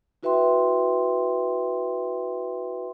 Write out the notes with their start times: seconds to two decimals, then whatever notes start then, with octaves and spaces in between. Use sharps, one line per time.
0.23 E4 F#4 B4 E5 G5 C6